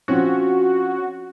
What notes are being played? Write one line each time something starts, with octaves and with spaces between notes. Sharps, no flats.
F3 C4 C#4 F#4